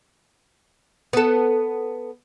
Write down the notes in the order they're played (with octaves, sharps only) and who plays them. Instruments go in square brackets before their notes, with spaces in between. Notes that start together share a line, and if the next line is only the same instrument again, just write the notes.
[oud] B3 A4